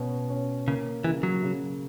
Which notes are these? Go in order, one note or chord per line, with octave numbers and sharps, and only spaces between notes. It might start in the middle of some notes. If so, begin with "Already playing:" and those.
Already playing: B2 C#4
C#4
C#3 A#3
C#3 E3
F#3
C#3